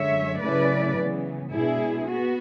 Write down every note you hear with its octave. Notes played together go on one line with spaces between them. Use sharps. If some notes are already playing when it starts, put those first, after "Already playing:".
Already playing: F#2 D3 G#3 C#5 E5
C#3 F#3 A3 C#4 E4 B4 D5
C#3 E3 B3
B2 G#3 D4 E4 G#4
B3 F#4